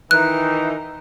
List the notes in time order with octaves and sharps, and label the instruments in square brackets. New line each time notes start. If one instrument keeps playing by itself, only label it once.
[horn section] D#3 E3 D#4 [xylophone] F#6